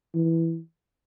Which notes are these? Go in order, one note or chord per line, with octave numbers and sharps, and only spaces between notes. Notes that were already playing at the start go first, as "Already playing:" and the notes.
E3